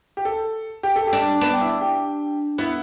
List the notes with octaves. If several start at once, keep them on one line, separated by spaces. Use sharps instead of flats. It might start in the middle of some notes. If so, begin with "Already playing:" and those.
G4
A4
G4
A4
G4
D4
B3 D4 B4
G5
E4 E5
G4 G5
B3 E4 E5